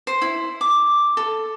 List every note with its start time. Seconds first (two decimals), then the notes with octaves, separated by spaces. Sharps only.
0.07 C5
0.22 E4
0.61 D6
1.17 A4